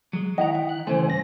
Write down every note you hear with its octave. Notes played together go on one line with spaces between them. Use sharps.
F#3 G#3
D#3 E4 D#5 F#5 G5 A#5
F#5 G5
F#6
C#3 E3 A3 C5 G#5
G2 A#6